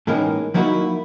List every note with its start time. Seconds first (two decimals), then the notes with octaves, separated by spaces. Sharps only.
0.07 A2 E3 G#3 A#3 C#4 D#4
0.54 F3 F#3 A#3 D#4 E4 F#4